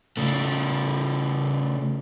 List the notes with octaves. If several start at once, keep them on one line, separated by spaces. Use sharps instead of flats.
C#3 A3